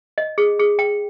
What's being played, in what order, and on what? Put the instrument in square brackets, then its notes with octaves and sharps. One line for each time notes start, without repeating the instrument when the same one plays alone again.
[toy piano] D#5
G#4
G#4
G5